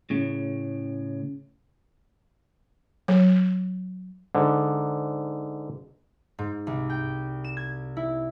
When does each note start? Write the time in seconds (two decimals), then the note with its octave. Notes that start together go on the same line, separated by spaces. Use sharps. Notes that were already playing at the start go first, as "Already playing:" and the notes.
0.10 A2 C#3
3.08 F#3
4.35 G#2 D3
6.39 G#2
6.67 C2
6.90 G5
7.44 E7
7.57 G#6
7.97 E4